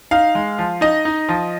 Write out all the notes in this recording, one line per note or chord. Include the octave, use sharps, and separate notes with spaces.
D#4 F5
G#3
F3
D#4 D#5
D#4
F3